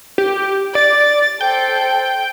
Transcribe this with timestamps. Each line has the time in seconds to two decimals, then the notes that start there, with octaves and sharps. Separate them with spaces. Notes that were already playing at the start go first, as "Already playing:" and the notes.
0.18 G4
0.75 D5 A6
1.41 A4 C5 G5